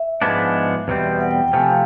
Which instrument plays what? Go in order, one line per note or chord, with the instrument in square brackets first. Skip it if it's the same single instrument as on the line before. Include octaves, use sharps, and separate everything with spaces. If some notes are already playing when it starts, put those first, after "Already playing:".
Already playing: [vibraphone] E5
[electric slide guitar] G#2 F3 G#3 B3 D4
E2 B2 G3 C4
[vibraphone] F#5
G5
G5
[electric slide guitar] C3 F3 A3 [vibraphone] G#5
[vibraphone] G5
F5